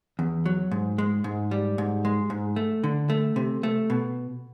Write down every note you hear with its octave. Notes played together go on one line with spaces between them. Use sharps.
E2
F#3
G#2
G#3
G#2
G3
G#2
G#3
G#2
A3
D3
A3
C3
A3
B2